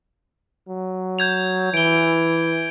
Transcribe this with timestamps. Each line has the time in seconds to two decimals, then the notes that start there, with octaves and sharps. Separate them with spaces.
0.68 F#3
1.19 G6 G#6 F7
1.74 E3 D7 G7